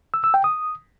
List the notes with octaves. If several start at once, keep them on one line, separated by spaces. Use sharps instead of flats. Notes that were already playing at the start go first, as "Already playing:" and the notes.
E6
E6
G5
D#6